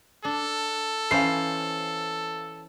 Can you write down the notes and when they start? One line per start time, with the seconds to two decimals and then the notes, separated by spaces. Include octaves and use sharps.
0.25 D4 A4
1.11 E3 C#4 C5 F5 C7